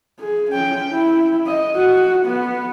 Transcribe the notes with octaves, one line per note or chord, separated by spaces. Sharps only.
G#4
C#4 G5
E4
D#5
F#4
B3